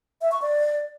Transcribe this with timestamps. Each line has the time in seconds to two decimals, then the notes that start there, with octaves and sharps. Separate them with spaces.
0.21 E5
0.32 C#6
0.42 D5